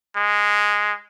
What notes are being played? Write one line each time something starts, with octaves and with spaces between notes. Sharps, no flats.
G#3